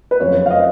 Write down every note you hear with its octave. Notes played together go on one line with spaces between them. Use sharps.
B4
F#1 F2 C#3 F3 C#5
F5
D#5